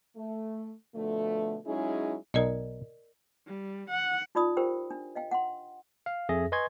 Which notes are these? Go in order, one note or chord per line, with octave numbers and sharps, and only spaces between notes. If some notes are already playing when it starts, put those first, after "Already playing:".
A3
B2 D3 F3 A3
F#3 G#3 C#4 D#4 E4 G#4
B1 D#4 A#4 D5 D#5
G3
F#5
D#4 F4 D5 B5 D#6
F4 G4 A#4 C5 G5
D4
D#5 F5 G5
F#5 C6
F5
F2 G#4 E5 A#6
B4 D#5 G#5 C6 C#6 G#6